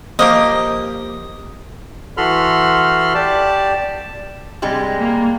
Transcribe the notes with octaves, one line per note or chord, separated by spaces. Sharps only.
F3 A#3 G4 D#5
E3 F#4 A4 B5 C6 F6
G4 D5 A5
C3 G3 G#3
A#3